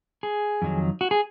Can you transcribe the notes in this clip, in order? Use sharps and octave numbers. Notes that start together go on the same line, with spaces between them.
G#4
F2 D#3 F#3
F#4
G#4